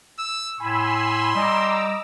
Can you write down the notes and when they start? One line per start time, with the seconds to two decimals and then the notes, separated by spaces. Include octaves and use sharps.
0.19 E6
0.60 A2 G#5 B5 C6 E6
1.35 G3 D#5 A#5 D6 E6